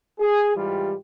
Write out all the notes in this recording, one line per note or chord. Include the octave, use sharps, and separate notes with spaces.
G#4
G#2 E3 G3 F4 G4